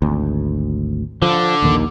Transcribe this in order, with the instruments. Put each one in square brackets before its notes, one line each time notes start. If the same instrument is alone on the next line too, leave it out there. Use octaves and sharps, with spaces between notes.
[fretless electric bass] G#1 D2
[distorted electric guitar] D3 [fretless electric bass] F3
[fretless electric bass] A#1 D#2 D#3